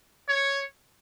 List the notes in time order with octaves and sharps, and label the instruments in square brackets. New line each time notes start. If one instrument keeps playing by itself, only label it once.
[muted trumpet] C#5